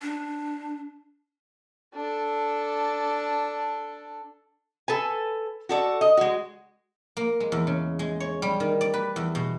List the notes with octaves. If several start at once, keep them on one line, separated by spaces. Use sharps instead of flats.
D4
D4 A4
A4 B4 G#5
F#4 A4 D5
D#5
G#3 F#4
A#3
G#3
E2
C#3
G#3
C#5
G3
D#3
D5
B4
E2
B2